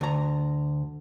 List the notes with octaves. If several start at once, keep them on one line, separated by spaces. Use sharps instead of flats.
D2 A#5